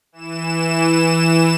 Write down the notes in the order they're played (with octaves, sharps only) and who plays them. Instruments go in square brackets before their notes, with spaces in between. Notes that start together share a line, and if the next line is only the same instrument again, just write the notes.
[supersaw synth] E3 E7